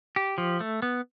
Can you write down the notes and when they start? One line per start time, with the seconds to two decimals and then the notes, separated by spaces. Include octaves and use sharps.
0.16 G4
0.38 F3
0.60 A3
0.82 B3